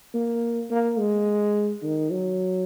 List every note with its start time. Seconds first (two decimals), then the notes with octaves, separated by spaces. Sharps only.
0.14 A#3
0.70 A#3
0.99 G#3
1.83 D#3
2.11 F#3